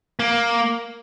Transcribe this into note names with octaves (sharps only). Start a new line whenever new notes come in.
A#3